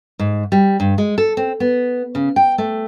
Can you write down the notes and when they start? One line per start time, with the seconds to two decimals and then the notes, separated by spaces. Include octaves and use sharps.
0.19 G#2
0.52 G3
0.80 G2
0.98 G#3
1.18 A4
1.37 C4
1.60 B3
2.15 C#3
2.36 G5
2.58 A3